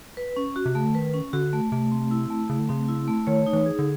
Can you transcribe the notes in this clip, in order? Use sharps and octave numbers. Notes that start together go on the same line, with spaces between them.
B4
C#4
F#4
C3
C#3 A3
D3
D#3 B4
C#4
D3 F#4
A3
C3 A3
C4
E4
A3
C#3 A3
D3
C#3 C4
E4
A3
D#3 C#5
D#4
E3
G#4
D3